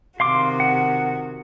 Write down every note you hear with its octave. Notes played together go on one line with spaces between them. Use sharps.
C3 D#3 F#4 F5 C6 D6
F#5